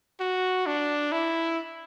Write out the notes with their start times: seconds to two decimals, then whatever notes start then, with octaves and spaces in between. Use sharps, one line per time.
0.20 F#4
0.66 D4
1.12 E4